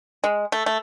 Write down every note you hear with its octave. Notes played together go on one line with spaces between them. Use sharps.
G#3
A3
A3